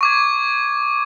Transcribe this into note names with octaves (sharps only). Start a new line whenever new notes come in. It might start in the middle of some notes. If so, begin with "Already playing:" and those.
C#6 D6 G#6